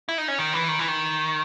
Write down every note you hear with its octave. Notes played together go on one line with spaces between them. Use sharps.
E4
D#4
C#4
D#3
E3
D#3
E3
D#3